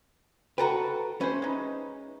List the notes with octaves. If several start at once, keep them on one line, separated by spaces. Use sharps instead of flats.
F#4 A4 B4 G5 A#5
A3 C#4 B4 C5
G#3 D#4